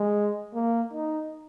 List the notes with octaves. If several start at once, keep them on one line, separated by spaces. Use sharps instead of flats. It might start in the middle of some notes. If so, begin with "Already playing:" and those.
Already playing: G#3
A#3
D#4